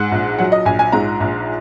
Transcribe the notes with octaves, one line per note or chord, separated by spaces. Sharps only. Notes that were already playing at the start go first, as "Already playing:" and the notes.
Already playing: G#2 F#5
A#1
F#3 F#5
D#5
A#1 G#5
G#5
G#2 A#5
A#1